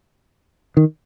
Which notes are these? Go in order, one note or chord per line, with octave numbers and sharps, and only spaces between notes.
D#3